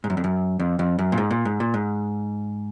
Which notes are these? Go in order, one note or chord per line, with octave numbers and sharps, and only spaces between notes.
G#2
F#2
F2
F#2
F2
F2
F#2
A#2
G#2
A#2
G#2
A#2
G#2